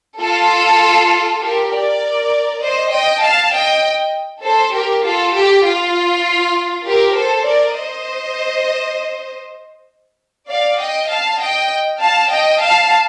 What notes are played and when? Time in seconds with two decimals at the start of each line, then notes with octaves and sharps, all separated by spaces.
0.20 F4 A4
1.41 G4 A#4
1.72 A#4 D5
2.62 C5 D#5
2.93 D#5 G5
3.23 F5 A5
3.54 D#5 G5
4.44 A4 C5
4.74 G4 A#4
5.05 F4 A4
5.35 G4
5.65 F4
6.86 G4 A#4
7.16 A4 C5
7.46 A#4 D5
7.77 C5 D#5
10.49 D5 F5
10.79 D#5 G5
11.10 F5 A5
11.40 D#5 G5
12.01 F5 A5
12.31 D#5 G5
12.61 F5 A5